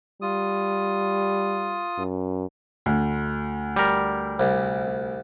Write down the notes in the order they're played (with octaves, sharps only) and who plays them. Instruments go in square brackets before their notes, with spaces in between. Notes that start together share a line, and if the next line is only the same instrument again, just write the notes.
[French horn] G3 [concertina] F4 D#6
[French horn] F#2
[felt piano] D2
[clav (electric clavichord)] G3 A#4
[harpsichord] C2